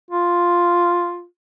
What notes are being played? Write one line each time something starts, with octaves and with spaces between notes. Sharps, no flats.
F4